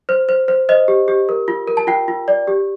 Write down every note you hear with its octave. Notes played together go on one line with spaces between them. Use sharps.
C5
C5
C5
C5 D#5
G4
G4
A#4
F4
A#4
A5
F4 G5
F4
D5
G4